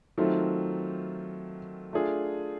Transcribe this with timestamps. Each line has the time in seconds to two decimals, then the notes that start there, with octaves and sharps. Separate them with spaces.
0.18 D#3 F#3 A3 C4 F4
1.93 A3 D4 F4 G#4